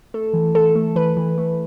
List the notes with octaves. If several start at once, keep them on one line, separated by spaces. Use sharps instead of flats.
A3 A4
E3
E3 A4
A3
E3 B4
E3
A3